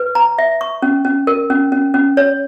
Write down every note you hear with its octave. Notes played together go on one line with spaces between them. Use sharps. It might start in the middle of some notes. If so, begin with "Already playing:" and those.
Already playing: B4
A#5
E5
C#6
C#4
C#4
A#4
C#4
C#4
C#4
C#5